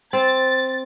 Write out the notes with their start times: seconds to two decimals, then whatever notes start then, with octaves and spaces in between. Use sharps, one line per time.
0.13 C4 A6